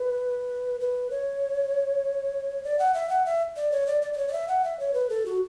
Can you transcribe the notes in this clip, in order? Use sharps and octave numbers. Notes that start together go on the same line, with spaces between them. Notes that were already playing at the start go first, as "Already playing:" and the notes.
Already playing: B4
B4
C#5
D5
F#5
E5
F#5
E5
D5
C#5
D5
D5
D5
C#5
D5
E5
F#5
E5
C#5
B4
A4
F#4